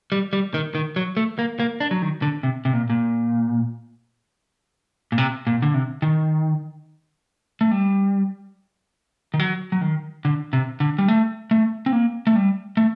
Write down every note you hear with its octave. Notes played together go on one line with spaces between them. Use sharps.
G3
G3
D#3
D#3
F#3
A3
A#3
A#3
D4
F#3
D#3
D3
C3
C3
A#2
A#2
A#2
C3
A#2
D3
C3
D#3
A3
G3
D#3
F#3
F#3
D#3
D3
C3
D3
G3
A3
A3
C4
A#3
A3
G3
A3